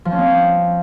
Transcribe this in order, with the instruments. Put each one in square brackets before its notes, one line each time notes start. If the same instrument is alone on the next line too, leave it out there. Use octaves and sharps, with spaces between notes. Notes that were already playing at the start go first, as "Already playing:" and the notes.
[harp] F3
C#4
C4